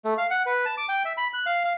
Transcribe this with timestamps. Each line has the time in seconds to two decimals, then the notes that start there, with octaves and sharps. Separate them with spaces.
0.05 A3
0.18 F5
0.30 F#5
0.46 B4
0.65 A5
0.77 D6
0.89 G5
1.05 E5
1.17 B5
1.34 F#6
1.46 F5
1.64 F5